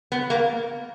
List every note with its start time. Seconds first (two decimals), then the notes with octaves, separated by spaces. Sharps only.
0.12 B3
0.30 A#3